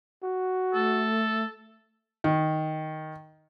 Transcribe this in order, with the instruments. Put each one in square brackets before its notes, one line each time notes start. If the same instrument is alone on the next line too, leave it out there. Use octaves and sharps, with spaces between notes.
[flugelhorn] F#4
[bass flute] A3 [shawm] A4
[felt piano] D#3